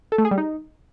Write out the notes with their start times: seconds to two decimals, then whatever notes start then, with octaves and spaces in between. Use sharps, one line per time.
0.12 A4
0.18 A3
0.25 G#4
0.31 G3
0.38 D#4